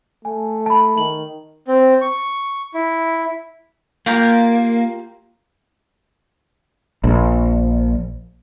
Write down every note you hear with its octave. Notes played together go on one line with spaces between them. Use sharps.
A3 G#5
A5 B5
D#3 F#7
C4
C#6
E4
A#3 F4 G4 A#5
A#1